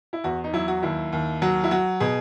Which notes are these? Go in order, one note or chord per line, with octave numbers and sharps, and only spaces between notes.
E4
E2 F#4
D#4
F#3 E4
F#4
D#2 E4
D#2
F#3 F#4
E4
F#3 F#4
B2 G#4